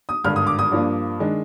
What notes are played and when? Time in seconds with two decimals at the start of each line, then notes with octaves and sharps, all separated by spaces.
0.09 D#6
0.24 G#1 G2 D3 F6
0.36 D#6
0.47 D6
0.59 D#6
0.72 G2 F3 A#3 D4
1.20 D#3 G#3 D4